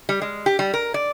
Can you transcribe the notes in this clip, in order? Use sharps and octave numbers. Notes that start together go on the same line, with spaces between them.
G3
G#3
G4
G3
A#4
D5